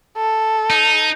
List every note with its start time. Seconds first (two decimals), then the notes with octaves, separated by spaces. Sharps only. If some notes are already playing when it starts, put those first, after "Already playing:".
0.17 A4
0.70 D#4